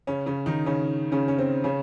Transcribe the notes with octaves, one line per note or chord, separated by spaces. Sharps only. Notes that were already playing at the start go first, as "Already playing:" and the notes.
C#3 C#4
C#3 C#4
D#3 D#4
C#3 C#4
C#3 C#4
C#4
C4
C#3 C#4